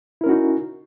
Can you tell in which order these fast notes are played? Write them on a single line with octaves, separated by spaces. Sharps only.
E4 A#4 C#4 F#4 D#4